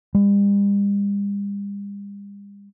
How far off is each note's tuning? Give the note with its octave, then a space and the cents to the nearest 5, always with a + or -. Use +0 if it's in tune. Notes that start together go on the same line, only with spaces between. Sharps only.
G3 +45